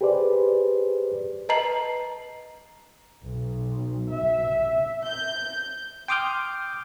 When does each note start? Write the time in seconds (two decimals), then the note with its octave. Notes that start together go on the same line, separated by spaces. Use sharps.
0.01 G4 G#4 B4 C5 D5
1.49 B4 D#5 A5 A#5 C7 F#7
3.23 B1
4.11 E5
5.06 G6
6.08 G5 C6 D6 D#6 F6 G6